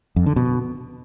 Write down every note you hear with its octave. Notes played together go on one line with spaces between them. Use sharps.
F2
D3
B2